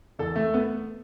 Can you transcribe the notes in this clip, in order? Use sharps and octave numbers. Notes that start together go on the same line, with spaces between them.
E2 A4
A3
B3